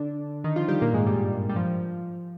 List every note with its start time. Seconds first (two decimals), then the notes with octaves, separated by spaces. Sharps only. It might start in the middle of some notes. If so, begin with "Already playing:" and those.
Already playing: D3 D4
0.44 D#3 D#4
0.56 F3 F4
0.68 G3 G4
0.82 A#2 A#3
0.93 G#2 G#3
1.06 G2 G3
1.49 G3
1.56 F3